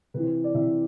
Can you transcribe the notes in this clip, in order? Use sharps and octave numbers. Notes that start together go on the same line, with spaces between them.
C3 E3 B4
C5
D5
C3 E3 E5